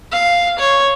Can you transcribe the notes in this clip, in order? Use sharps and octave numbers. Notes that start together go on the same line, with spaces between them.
F5
C#5